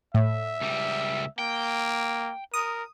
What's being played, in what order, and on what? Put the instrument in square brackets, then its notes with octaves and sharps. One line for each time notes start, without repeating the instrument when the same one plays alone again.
[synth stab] A2 [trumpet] E5
[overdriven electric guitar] C#2 G3
[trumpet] A#3 [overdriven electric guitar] G5
[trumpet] A#4 [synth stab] D#6